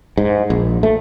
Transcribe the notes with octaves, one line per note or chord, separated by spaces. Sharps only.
G#2
A#1
A3